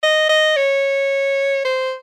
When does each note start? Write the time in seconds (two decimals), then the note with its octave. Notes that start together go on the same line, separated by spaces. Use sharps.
0.03 D#5
0.29 D#5
0.57 C#5
1.65 C5